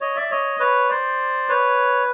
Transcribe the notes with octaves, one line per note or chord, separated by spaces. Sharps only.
C#5 D#5
D5 E5
C#5 D#5
B4 C#5
C5 D5
B4 C#5